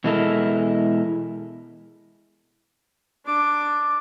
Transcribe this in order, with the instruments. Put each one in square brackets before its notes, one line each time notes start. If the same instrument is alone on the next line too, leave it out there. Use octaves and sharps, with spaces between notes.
[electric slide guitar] B2 E3 G#3 E4 A4 A#4
[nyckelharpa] D4 D6